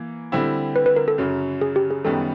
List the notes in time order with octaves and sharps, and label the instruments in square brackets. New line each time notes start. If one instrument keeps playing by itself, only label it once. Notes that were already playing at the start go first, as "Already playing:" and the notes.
Already playing: [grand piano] E3 A#3
D3 G3 C4 E4
[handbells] B4
B4
A#4
A4
[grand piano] F#2 C#3 F#3
[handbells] G#4
G4
G#4
[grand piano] F#2 D#3 G3 B3 [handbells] A4